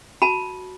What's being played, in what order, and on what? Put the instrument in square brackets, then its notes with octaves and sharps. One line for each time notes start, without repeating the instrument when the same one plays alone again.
[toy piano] F#4 A5 B5